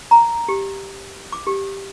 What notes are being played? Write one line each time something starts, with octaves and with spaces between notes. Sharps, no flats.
A#5
G4
D6
G4